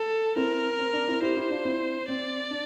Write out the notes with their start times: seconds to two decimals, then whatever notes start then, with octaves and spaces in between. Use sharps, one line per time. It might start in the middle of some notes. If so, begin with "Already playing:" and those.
Already playing: A4
0.36 C4 E4 A#4
0.79 C4
0.93 D4
1.08 C4 E4
1.22 E4 G4 C5
1.36 E4 G4
1.50 D4 F4
1.65 C4 E4
2.08 C4 D5
2.51 D4